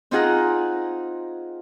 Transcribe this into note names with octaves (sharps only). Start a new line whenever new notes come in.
C4 D#4 F4 G#4 F#5 A#5